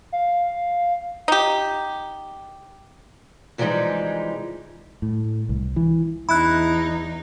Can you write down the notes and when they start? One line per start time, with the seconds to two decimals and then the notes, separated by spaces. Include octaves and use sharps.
0.12 F5
1.28 D#4 G4
3.58 C3 E3 F3 G3 G#3 D#4
5.02 A2
5.49 C2
5.76 E3
6.29 E2 D#4 E4 B5 F#6